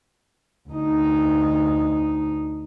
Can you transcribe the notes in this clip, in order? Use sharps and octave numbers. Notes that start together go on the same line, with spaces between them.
D2 D#4